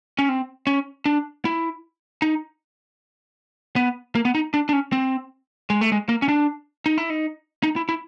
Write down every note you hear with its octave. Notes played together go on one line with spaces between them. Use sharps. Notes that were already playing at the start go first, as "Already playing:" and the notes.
C#4
C4
C#4
D4
E4
D#4
B3
A#3
B3
D#4
D4
D4
C#4
C4
G#3
A3
G#3
A#3
C#4
D4
D#4
E4
D#4
D#4
E4
E4